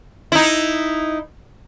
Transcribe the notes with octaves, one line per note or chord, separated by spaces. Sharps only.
D#4 E4